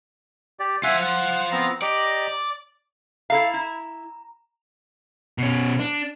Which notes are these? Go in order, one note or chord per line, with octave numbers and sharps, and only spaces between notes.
G4 D5
F4 C5 E5 F#5 G#5
F#5
B3 C4 A#5
G4 D5 D#5 A#5
E4 A4 F5 A#5 B5
E4 A#5
B2 C#4
D4